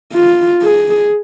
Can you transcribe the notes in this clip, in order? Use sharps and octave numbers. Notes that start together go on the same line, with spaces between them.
F4
G#4